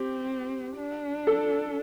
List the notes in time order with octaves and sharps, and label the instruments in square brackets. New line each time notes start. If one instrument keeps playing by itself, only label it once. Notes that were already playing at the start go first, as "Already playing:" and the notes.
Already playing: [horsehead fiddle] C4 [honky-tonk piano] G4
[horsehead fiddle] D4
[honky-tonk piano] A4